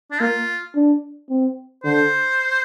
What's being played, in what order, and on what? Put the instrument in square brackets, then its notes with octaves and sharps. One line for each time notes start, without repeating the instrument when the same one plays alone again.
[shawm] D4
[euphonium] A#3 [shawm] F4
[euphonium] D4
C4
[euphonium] D3 [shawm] C5